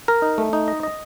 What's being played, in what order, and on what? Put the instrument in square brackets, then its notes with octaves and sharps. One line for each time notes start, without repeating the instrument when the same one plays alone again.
[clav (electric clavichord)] A#4
D#4
A3
D#4
D#5
D#5